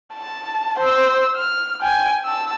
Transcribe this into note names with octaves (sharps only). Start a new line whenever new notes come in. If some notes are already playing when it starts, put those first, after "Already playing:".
A5
C5 E6
F6
G5 G#5
A5 E6